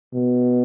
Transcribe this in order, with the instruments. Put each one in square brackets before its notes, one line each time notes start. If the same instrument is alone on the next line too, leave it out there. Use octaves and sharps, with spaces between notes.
[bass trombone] B2